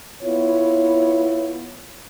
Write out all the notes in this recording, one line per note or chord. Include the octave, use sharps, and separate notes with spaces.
B3 E4 F4 C#5